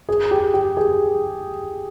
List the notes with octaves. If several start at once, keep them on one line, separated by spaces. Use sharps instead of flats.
G#4
G4
G4
G#4